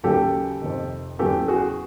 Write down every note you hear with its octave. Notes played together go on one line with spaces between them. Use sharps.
D#2 C#3 F#3 G4 A4
F2 C3 D#3
E2 C#3 F#3 G4 A4
F#4 G#4